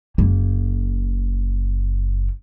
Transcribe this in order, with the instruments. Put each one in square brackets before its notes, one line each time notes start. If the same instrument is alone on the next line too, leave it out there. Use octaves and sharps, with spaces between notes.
[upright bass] F#1 A#3